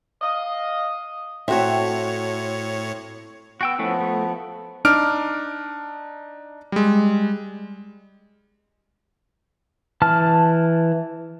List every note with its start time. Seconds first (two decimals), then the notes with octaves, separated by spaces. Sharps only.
0.22 D#5 F5
1.48 A2 A3 C4 F#4 C#5 E5
3.61 B3 F#4 G5 E6
3.79 F3 A3 B3 C#4 E4
4.00 A3
4.85 D4 D#4 D6 F6 D7
6.72 G3 G#3
10.02 E3 A5 F6